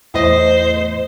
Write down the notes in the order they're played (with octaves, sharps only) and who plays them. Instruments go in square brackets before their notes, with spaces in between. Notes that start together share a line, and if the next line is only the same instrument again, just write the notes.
[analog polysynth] E2 A2 D#5 [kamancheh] C5